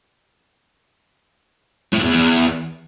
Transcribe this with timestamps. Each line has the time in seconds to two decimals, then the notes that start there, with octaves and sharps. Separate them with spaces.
1.93 A2
1.98 G#2
2.03 E2